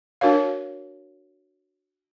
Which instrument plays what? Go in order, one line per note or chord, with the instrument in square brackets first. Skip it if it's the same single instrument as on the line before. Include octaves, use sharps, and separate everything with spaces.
[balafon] D4 F#4 A#4 C#5 F5